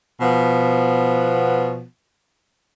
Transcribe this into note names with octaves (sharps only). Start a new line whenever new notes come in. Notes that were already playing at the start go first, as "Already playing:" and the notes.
B2 F3 B3